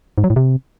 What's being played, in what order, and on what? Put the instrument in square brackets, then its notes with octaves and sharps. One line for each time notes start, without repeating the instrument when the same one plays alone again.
[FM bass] G#2
F#3
A2
C3